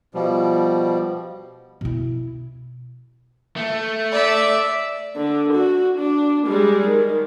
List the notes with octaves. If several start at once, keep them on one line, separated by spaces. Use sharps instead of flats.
B2 F3 G3
B2 E4
A3
D5 E5
D3
F#4
D4
G3 G#3
D#3